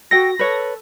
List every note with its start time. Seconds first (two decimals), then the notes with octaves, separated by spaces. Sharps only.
0.11 F#4 A4 G5 A#6
0.39 A4 B4 C#5